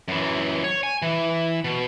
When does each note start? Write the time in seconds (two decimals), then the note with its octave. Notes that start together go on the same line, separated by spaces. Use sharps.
0.08 F#2 E3
0.64 C#5
0.83 G#5
1.02 E3
1.64 B2